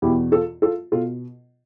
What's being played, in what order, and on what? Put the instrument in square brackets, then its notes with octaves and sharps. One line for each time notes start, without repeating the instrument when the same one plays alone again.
[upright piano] E2 B2 E4 G4
F4 A4
F4 A4
B2 F4 A4